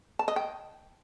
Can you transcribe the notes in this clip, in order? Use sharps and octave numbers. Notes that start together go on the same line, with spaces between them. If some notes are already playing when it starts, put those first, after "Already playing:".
A5
D#5
G5